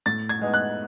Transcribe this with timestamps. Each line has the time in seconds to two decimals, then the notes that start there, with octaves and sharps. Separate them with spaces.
0.06 A2 A6
0.29 G#6
0.41 G#3 B3 D#4
0.54 F#6